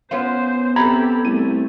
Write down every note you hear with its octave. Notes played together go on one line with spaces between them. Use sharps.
B3 C#4 F4 C5
C3 G4 A4 A#5 B5 G#6
C2 A3 D#7